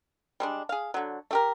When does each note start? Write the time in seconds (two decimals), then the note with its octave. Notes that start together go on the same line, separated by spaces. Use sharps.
0.40 G3 G#3 D4
0.69 G#4 F5
0.94 D3 F#3
1.31 A3 G4 A#4